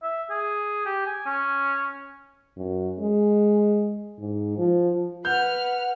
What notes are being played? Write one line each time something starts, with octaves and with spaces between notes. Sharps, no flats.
E5
G#4
G4
G#5
C#4
F#2
G#3
G#2
F3
B4 F#5 F6 G6